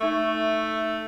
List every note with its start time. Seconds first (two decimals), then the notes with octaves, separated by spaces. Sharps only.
0.01 A3 D#4 E5 C#6